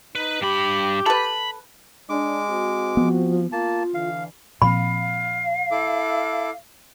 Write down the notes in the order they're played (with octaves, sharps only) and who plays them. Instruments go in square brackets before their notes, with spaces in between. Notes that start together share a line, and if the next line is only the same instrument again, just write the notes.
[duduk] D#4 [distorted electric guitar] B4
[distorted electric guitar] G2 B5 [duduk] G4
[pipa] A4 B4 [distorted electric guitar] B5
[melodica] G#3 D6 [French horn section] D4
[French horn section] C4 F#4
[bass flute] F3 [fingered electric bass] B3
[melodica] A#3 A5 [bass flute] F4
[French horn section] D3 E3 [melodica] F5
[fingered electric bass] A#2 F3 C4 [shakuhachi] F5 [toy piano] B5
[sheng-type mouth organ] E4 A4 D6